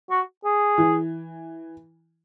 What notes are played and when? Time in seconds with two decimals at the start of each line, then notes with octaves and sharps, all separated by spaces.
0.10 F#4
0.44 G#4
0.78 E3